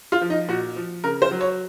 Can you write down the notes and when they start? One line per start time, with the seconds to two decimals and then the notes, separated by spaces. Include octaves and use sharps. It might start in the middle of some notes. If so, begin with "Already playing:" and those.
0.12 F4
0.21 F3
0.30 D#4
0.48 A#2 F#4
0.76 F3
1.04 C#3 A#4
1.22 C5
1.31 F#3
1.41 C#5